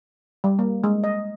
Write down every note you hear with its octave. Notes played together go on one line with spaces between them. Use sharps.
G3
A#3
G#3
D#5